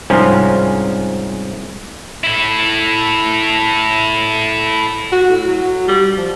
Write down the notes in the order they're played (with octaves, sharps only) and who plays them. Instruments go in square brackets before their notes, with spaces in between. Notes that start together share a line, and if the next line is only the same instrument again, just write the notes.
[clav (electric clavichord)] C2 G#2 F3 C4 C#4
[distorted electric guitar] E4 A4
[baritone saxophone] F#4
A2
F#3
G3
F3